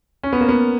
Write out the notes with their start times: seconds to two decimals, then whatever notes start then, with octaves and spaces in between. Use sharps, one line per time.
0.23 C#4
0.33 B3
0.41 A#3
0.49 B3